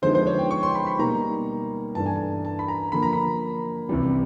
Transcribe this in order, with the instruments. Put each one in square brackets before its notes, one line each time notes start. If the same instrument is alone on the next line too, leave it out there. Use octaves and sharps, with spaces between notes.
[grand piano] D3 F3 G#3 B3 D#4 C5
C5
C#5
G5
C#6
C6
B5
B5
B2 G3 A#3 D#4 A#5
G2 E3 A3 D4 A5
G#5
A5
A5
B5
A#5
D3 F3 A#3 B5
A#5
B5
C2 C3 E3 G3